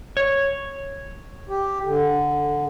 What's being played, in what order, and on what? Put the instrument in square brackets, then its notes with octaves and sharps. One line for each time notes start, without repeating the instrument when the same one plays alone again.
[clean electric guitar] C#5
[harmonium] G4
D3